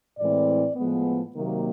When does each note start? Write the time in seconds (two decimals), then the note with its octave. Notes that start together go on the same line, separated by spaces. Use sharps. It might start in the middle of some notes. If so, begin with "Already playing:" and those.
0.18 A2 E3 G#3 C4 D5
0.76 A2 F3 G#3 B3
1.35 C3 D#3 F#3 A#3